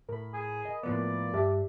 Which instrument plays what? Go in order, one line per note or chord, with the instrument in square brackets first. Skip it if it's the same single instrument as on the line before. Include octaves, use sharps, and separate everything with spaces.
[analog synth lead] A2 [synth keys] A#4 B5
[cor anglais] G#4
[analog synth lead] D#5
[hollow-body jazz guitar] A2 F3 B3 [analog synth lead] A#3 [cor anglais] D5
[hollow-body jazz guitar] G2 [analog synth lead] D4 [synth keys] G4 E5